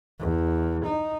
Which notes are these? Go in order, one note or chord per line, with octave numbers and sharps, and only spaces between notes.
E2
D#4